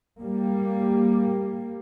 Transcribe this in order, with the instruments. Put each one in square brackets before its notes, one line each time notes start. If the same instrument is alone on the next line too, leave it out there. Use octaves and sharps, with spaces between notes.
[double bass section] G3 A#3